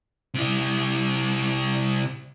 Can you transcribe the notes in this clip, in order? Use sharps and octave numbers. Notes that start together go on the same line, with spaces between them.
C3 E4